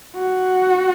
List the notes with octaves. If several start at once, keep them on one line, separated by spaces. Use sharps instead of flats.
F#4